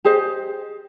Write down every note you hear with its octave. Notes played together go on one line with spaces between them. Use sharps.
G4 G#4 C5 D#5